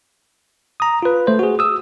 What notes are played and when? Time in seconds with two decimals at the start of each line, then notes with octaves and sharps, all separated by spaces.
0.80 A#5 D#6
1.03 F4 B4
1.27 A3 C5
1.39 F#4 G#4
1.59 D#6 E6